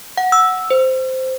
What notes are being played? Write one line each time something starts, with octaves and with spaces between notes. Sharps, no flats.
F#5
E6
C5